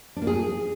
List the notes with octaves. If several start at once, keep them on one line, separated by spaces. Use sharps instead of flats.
D4
A#3
G#4